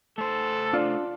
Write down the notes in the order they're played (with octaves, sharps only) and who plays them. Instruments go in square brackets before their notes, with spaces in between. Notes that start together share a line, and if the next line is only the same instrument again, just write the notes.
[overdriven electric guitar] A3 C5 [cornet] A4
[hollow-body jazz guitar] D4 [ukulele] F4